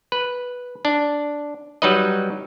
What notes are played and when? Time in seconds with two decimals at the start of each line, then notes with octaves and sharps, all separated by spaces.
0.12 B4
0.85 D4
1.82 F#3 G3 D#4 B4 D#5